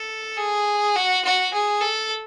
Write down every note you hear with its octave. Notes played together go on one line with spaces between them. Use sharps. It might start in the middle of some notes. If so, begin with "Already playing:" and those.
Already playing: A4
G#4
F#4
F#4
G#4
A4